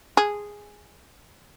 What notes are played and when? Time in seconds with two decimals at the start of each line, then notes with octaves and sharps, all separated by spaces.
0.17 G#4